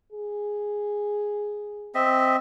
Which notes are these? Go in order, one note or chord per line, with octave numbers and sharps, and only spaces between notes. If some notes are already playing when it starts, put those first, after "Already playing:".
G#4
C4 D#5 E5